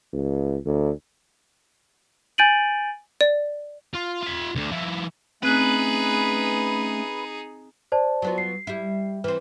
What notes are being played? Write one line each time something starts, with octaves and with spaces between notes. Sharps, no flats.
C#2
D2
G#5 G6 A6 D7 D#7 F#7
D5
F4
F4 E5
D2 D3
F3 E4
A3 C4 C#4 D#4 G#4 B4 F#6
C5 D5 A5
F#3 B3 F4
C7
G3 E4
E3 C4 B4